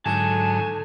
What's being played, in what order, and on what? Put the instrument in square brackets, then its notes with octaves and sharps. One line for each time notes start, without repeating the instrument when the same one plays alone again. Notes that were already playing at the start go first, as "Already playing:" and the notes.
[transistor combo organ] G#2 D3 F#3 [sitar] A3 [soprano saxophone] G#5 [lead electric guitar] A5